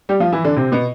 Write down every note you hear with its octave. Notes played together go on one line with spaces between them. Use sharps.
G3 G4
F3 F4
E3 E4
D3 D4
C3 C4
B2 B3